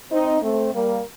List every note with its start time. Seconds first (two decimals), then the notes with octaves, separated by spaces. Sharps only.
0.12 C4 D#4
0.42 A3 C4
0.74 G3 A#3